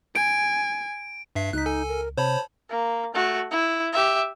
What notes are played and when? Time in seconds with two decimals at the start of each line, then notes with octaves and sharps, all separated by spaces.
0.15 G#5 D7
1.36 G2 E5 C7
1.53 C#2 D#4 F#6 B6
1.66 A4 G#5
1.89 A#4
2.18 C3 C5 C#5 A5 B5
2.70 A#3
3.14 A3 F#4
3.51 E4
3.93 G4 E5